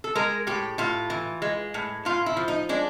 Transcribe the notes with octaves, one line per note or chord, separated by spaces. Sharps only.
A4
G#3 A#4
A2 G4
A2 F4
E3
G#3
A2
A2 F4
E4
F3
D#4
G#3 D4